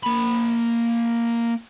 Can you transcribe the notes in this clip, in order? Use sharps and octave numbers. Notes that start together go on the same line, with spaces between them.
A#3 B5